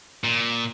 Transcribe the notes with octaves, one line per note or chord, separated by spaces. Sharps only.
A#2